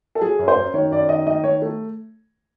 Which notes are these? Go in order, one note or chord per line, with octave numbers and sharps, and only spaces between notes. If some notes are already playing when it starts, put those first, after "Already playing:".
A4
F#3 G#4
F#2
C5
F#2
D#3 C#5
F#2 D5
D#3 D#5
D#3 D#5
D#3 C#5
A3